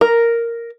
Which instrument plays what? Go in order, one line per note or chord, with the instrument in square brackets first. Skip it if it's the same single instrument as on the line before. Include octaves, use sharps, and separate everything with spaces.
[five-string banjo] A#4